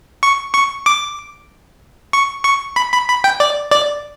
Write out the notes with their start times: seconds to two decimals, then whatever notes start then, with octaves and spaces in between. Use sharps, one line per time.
0.23 C#6
0.54 C#6
0.86 D6
2.13 C#6
2.44 C#6
2.76 B5
2.93 B5
3.09 B5
3.24 G5
3.40 D5
3.71 D5